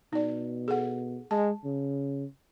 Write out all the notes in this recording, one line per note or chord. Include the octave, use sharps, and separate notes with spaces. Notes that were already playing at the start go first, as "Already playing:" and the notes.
B2 D#4 D5
G#4 A4 F#5
G#3 A5
C#3